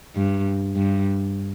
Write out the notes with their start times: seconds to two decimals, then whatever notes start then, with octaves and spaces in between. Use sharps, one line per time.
0.16 G2
0.76 G2